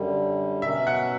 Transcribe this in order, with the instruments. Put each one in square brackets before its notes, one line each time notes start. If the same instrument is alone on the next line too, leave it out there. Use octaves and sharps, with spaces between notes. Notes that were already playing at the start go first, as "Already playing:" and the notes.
Already playing: [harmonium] F#2 D3 G3
[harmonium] B2 F#3 C#4 [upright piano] E5
[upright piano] F#5